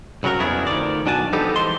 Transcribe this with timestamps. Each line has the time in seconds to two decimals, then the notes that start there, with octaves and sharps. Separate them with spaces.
0.23 C2 C#3 F#3 F#4 A#4
0.39 F2 C#3 B3 D4 E4 G#4
0.67 D2 D#3 F3 D5
1.06 B1 D4 F#4 G#5 A5
1.33 F3 G3 B3 D#4 G4 A4
1.56 E3 G#3 C5 C6